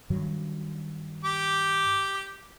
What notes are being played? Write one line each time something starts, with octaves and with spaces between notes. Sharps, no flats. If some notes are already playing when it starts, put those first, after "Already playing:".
G2 D#3 F#3
G4 D6